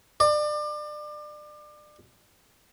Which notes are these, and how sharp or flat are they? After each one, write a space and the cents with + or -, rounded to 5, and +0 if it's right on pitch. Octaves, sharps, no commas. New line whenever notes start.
D5 +30